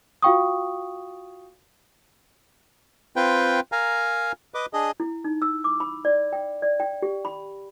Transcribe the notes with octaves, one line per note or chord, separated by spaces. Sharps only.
F4 F#4 F5 G5 C#6 D#6
C4 F4 B4 G5
A#4 F5 G#5 A#5
B4 D#5 D6
D4 G#4 D#5
E4
D#4
E6
D6
B5
D5
G5
D5
G5
G4
B5